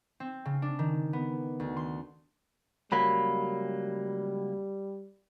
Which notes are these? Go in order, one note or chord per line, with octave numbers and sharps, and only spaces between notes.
C4
C#3
D4
D#3
B3
D2
C6
C#2 F#3 G3 A#3 B5